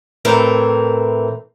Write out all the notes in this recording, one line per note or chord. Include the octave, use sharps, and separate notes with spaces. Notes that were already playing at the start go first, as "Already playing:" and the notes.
A2 E3 C4 A#4